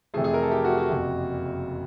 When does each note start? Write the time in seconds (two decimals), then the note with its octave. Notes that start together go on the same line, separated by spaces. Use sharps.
0.14 F2 C3 E3 A3 G#4
0.24 G#4
0.34 A#4
0.42 A4
0.51 G4
0.64 F#4
0.77 F#4
0.89 F#1 F2 C3